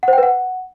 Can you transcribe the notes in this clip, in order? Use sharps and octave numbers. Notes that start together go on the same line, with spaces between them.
F#5
C5
G5
B4
F#5